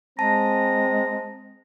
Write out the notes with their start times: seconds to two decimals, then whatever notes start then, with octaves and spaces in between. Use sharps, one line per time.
0.19 G#3 C4 A5 A#5